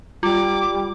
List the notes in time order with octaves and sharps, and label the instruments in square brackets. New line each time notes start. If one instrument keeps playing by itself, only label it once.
[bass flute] G3 [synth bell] F4 [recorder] D6